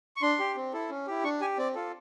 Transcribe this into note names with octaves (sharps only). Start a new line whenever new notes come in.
C#6
D4 C6
G4
C4
E4 A4
C#4
E4 G4
D4 C#6
G4 G#5
C4 D5
F4 A4